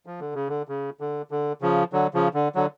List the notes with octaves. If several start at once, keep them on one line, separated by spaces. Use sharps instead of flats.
F3
D3
C#3
D3
C#3
D3
D3
C#3 F3
D3 F#3
C#3 F3
D3
D3 F#3